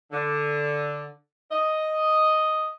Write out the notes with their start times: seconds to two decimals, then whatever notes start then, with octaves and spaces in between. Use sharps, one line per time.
0.11 D3
1.50 D#5